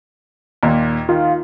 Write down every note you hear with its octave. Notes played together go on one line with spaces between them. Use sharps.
D#2 A#2
D#3 F4